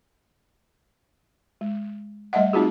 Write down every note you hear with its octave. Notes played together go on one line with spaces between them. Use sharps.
G#3
G3 A3 D#5 E5 F#5
A3 C4 D#4 F4 F#4 G#4